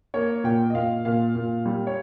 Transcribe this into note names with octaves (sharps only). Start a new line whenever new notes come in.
A#3 C#5
A#2 G5
D#5
A#2 F5
A#2 F5
A#2
G3
C#5